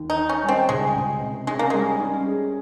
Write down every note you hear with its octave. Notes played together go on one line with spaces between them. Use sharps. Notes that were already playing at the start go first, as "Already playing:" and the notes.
Already playing: D#2
D#4
D#3
C#4
G3
C4
C#2 G#3
C#2
C3
G#3 C#4
A#3
G3 G#3
C#4
G#4